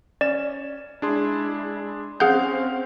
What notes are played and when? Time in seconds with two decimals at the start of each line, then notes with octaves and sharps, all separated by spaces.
0.21 C#4 D5 E7
1.02 G#3 D4 E4 G#4 C6
2.20 C4 C#4 G#4 F5 F#5 G6